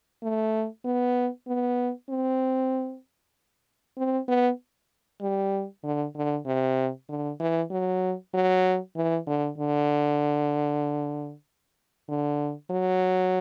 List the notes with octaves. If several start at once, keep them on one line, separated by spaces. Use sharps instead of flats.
A3
B3
B3
C4
C4
B3
G3
D3
D3
C3
D3
E3
F#3
F#3
E3
D3
D3
D3
F#3